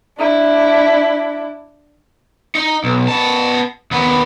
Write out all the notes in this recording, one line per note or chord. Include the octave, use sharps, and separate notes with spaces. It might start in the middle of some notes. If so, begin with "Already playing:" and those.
D4 E4
D#4
B1
B3 A5
D#2 B3